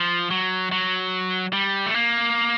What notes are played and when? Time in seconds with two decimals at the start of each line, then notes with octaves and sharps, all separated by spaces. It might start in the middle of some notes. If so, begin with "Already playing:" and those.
Already playing: F3
0.31 F#3
0.72 F#3
1.53 G3
1.86 A3
1.94 A#3